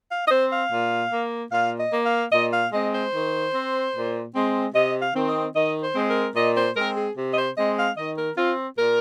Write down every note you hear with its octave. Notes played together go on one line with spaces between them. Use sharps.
F5
D#5
C4 C5
F5
A#2
A#3
A#2 F5
D#5
A#3
F5
A#2 D#5
F5
G#3 C4 D#5
C5
D#3
C4
A#2
G#3 C4
C3 D#5
F5
D#3 C4
D#5
D#3 D#5
C5
G#3 C4
A#4
A#2 D#5
C5
G#3 C4 A#4
G#4
C3
D#5
C5
G#3 C4 D#5
F5
D#3 D#5
A#4
C4 F4
A#2 A#4